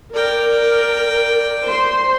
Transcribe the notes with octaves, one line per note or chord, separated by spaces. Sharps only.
A#4 D5 G5
C5 C6